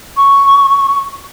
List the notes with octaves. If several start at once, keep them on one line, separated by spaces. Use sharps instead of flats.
C#6